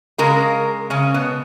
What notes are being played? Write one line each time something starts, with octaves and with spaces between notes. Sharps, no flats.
C#3 G#3 A#3 A#4
C#3 C#4
B2 B3